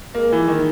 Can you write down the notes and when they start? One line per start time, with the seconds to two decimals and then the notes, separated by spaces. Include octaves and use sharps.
0.15 G#3 A#3
0.32 E3
0.48 D#3